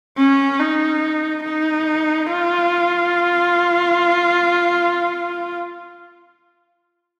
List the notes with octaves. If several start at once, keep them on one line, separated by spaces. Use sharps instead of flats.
C#4
D#4
D#4
F4